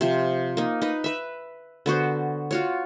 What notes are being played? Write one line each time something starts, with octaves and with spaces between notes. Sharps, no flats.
C3 F3
A#3 D#4
D#4 B4
B4 E5
D3 B3 F#4 C5
F4 F#4 C#5